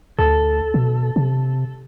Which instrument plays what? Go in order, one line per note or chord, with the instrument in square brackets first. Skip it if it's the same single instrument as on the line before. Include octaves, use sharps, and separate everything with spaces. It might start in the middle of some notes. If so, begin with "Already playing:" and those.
[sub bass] D2 [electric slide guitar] A4
[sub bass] B2
C3